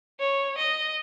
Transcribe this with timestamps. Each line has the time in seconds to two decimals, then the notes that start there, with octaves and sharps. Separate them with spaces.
0.20 C#5
0.57 D#5